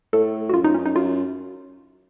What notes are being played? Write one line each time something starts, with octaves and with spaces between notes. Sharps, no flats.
A2 A4
F#4
F#2 F4
D#4
C#4
D#4
F#2 F4